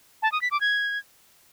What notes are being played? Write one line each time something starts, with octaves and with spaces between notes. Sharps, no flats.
A5
D#6
B6
D6
G#6